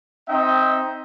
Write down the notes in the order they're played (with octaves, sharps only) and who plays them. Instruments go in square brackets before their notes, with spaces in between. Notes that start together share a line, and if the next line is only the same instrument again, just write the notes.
[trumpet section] C4 D#4 D#5 E5 G5